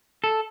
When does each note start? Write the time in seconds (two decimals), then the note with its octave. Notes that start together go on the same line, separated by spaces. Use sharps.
0.24 A4